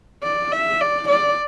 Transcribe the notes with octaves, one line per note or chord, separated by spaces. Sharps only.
D5
E5
D5
D5